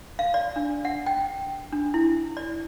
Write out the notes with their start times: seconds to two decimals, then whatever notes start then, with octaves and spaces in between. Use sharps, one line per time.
0.19 F5
0.34 D5
0.56 D4
0.85 F#5
1.06 G5
1.72 D4
1.94 E4
2.37 D5